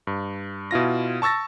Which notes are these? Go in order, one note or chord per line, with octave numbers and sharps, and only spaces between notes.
G2
B2 E4 F4 A#6
A5 C#6 E6 A6 A#6